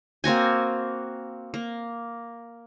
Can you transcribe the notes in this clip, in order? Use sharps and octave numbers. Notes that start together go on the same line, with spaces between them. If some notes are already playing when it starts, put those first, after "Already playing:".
A#3 C4 F#4 G#5
A#3